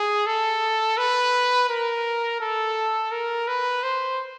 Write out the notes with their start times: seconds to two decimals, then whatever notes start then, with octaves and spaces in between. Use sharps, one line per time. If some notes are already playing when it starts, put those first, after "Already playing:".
Already playing: G#4
0.26 A4
0.97 B4
1.69 A#4
2.40 A4
3.11 A#4
3.47 B4
3.83 C5